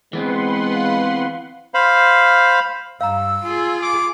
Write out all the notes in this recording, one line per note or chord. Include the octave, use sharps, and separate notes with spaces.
E3 G#3 B3 C4 B4 F#5 C6
F5
C5 F5 B5
G2 F5 A#5 E6
F4 G#4
D6